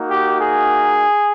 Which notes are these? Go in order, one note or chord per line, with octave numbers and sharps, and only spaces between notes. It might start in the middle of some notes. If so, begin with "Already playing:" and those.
Already playing: A#3 D#4 F#4
G4
G#4